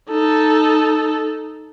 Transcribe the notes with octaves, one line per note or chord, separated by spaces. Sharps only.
D#4 A4